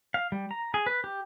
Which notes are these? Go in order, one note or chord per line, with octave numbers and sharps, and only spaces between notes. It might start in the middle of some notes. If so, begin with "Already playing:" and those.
F5
G3
A#5
G#4
B4
G4